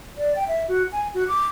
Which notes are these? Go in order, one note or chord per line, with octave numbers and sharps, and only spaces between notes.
D5
G5
E5
F#4
G#5
F#4
D6